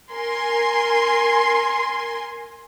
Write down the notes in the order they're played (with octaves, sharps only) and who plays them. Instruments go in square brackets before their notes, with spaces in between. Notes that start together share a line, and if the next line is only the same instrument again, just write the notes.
[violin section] A#4 G#5 C6